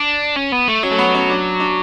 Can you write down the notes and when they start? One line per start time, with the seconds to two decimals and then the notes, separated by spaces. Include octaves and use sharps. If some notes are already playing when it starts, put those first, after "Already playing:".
Already playing: D4
0.37 C#4
0.52 B3
0.68 A3
0.83 F#3 C#4
0.91 A3
0.98 B3
1.15 C#4
1.30 D4
1.60 D4